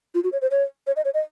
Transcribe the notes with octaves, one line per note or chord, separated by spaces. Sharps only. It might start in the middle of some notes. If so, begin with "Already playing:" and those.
F4
F#4
C#5
C5
C#5
C#5
D#5
C#5
D#5